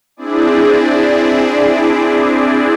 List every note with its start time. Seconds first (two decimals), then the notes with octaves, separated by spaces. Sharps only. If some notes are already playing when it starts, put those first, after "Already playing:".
0.17 C4 D4 E4 G#4 D5